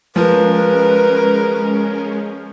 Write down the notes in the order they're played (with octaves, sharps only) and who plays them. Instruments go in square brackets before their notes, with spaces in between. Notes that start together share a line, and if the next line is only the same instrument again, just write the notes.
[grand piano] F3 [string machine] G#3 C#4 [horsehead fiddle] A#4 [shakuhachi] B4